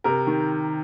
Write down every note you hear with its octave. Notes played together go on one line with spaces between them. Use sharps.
C3 A#4
D#3